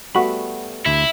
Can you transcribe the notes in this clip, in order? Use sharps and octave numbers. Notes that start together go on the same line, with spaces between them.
G3 A3 B3 F#4 B5
D2 E4